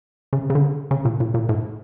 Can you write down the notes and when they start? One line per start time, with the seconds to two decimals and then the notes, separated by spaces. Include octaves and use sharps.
0.33 C#3
0.50 C#3
0.55 D3
0.91 C#3
1.05 A#2
1.20 A#2
1.34 A#2
1.49 A2